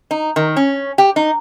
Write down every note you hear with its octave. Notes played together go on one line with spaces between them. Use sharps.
D#4
D#3
C#4
G4
D#4